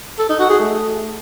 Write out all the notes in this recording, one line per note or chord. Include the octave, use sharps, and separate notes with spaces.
A4
D#4
F#4
G#4
A3